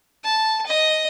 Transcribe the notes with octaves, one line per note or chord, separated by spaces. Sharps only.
A5
D#5